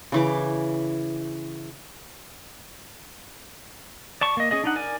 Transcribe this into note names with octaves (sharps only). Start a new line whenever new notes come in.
C#3 E3 D6
D5 A5 C#6
A#3 D#5
C#4 G#4 D#5
D4 D#4 F#5
A#4 D5 G#5